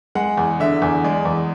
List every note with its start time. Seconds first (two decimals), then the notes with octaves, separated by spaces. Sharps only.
0.15 G#3 F#5
0.38 E2
0.60 D3 E5
0.82 E2
1.04 G#3 D5
1.25 E2